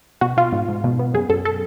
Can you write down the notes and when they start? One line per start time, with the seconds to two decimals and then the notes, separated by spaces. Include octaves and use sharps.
0.21 B2 F#4
0.37 B2 F4
0.53 G#2
0.68 G#2
0.84 B2
0.99 B3
1.14 F#2 G#4
1.29 F#2 A4
1.45 A4